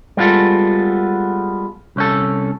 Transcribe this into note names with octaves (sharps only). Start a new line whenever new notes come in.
G3 G#3 B3 F4 A4
C2 C#4 A4